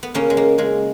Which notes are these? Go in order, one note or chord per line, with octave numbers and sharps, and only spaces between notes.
B3
C#3 A#3 C#4
G#3
A#3
C#3 G#3